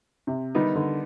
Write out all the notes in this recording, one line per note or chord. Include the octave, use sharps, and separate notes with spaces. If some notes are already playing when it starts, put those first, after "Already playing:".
C3
D3 D#3 G3 B3 D#4
D3